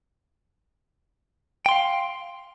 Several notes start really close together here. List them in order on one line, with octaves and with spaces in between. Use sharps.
G5 C6 F5